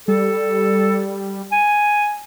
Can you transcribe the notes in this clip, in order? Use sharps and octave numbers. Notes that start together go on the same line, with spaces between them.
G3 A4
G#5